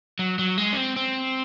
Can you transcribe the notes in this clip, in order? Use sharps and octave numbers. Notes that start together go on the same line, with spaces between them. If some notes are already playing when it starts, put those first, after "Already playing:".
F#3
F#3
G#3
C#4
C4
C4